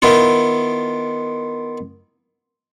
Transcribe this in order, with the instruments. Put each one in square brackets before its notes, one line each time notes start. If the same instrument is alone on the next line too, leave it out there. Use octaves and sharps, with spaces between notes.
[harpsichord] D#3 B3 E4 F4